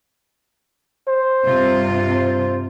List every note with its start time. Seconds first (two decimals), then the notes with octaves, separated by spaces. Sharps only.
1.08 C5
1.46 G2 C3 F4
2.16 C5